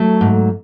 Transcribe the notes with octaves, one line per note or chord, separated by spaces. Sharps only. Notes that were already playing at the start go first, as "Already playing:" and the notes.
Already playing: F#3 A3
G#2